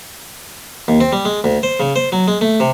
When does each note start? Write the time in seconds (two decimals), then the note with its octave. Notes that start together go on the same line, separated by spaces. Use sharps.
0.88 D#2
1.00 C4
1.12 G3
1.25 G#3
1.44 D2
1.63 C5
1.80 C#3
1.96 C5
2.12 F#3
2.28 G#3
2.41 A3
2.60 C3